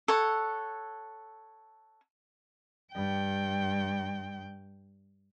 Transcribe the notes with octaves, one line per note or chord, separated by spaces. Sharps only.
A4 C#5 F#5
G2 G5